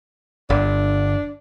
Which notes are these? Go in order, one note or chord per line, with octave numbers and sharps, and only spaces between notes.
G1 D4